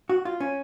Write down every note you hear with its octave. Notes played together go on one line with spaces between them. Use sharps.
F#4
F4
C#4